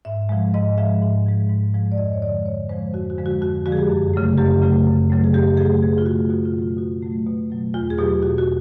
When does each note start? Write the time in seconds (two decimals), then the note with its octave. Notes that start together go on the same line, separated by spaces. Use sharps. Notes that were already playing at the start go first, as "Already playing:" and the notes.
0.05 G#2 E5
0.29 F3 G#3
0.54 G#2 D#5
0.78 F3 G#3 E5
1.02 G#2
1.26 F3 G#3
1.49 G#2
1.74 F3 G#3
1.92 D5
1.98 F2 D#5
2.13 C#5
2.22 D3 F3 G#3 D5
2.45 F2 C#5
2.69 D3 F3 G#3 C5
2.94 F2 F#4
3.10 F#4
3.18 D3 F3 G#3
3.26 F#4
3.42 F2 F#4
3.66 D3 F3 G#3 F#4
3.72 G#4
3.77 G4
3.90 F#2
4.14 C#3 F#3 A3
4.38 F#2 G4
4.62 C#3 F#3 A3
4.86 F#2
5.10 C#3 F#3 A3
5.24 G#4
5.33 F#2 G4
5.57 C#3 F#3 A3 G#4
5.82 B2 G#4
5.98 F4
6.06 F#3 A3 F#4
6.30 B2 F#4
6.46 F4
6.53 F#3
6.59 A3 F4
6.77 B2 F#4
7.02 F#3 A3
7.26 B2
7.50 F#3 A3
7.74 E2 F4
7.90 G#4
7.98 B2 F#3 G4
8.22 E2 F#4
8.38 F#4